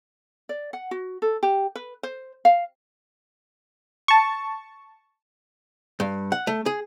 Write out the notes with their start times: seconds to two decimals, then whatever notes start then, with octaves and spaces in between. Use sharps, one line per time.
0.49 D5
0.73 F#5
0.91 F#4
1.22 A4
1.43 G4
1.75 B4
2.03 C5
2.45 F5
4.08 A5 C#6
6.00 G2
6.32 F#5
6.47 A3
6.66 G#4